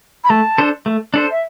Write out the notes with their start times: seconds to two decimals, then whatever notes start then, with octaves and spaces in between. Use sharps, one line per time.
0.24 B5
0.30 A3 A5
0.58 D4 A4 C5
0.86 A3
1.14 D4 A4 C5
1.31 E5